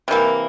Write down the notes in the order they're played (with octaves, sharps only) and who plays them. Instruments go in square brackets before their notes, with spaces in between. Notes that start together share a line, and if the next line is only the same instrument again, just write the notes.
[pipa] C3 E3 A#3